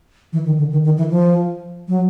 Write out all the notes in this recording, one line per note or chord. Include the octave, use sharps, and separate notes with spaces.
E3
D#3
D3
D#3
D#3
E3
F3
F#3